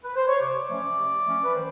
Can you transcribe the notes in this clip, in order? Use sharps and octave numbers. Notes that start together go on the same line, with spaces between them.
B4
C5
C#5
C3 D5
F3 A3 C#4
C3
F3 A3 C#4
B4
D#3 C5